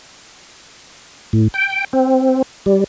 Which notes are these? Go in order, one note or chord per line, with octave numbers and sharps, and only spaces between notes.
A2
G5
C4
G3